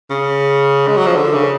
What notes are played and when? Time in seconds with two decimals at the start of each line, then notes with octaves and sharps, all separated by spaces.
0.10 C#3
0.88 G#3
0.97 F#3
1.07 F3
1.17 D3
1.34 C#3